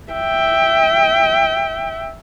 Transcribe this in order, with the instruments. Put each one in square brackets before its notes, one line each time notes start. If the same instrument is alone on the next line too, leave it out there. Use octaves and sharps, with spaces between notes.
[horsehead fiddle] E5 G5